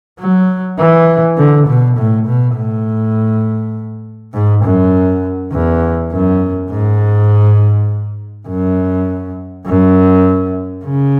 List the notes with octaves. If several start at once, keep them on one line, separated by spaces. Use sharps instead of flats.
F#3
E3
D3
B2
A2
B2
A2
G#2
F#2
E2
F#2
G#2
F#2
F#2
C#3